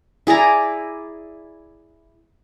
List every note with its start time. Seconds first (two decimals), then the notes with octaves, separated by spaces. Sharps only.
0.27 E4 G#4 D5 A#5